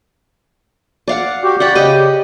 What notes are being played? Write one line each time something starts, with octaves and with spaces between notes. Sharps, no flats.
D5 F5 F#5
F#4 G4
D5 F#5 G5 B5
C#3 G4 D5 D#5